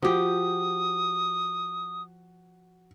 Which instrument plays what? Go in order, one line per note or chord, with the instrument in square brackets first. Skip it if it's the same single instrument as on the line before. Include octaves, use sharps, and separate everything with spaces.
[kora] F3 G4 [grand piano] F#4 [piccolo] D#6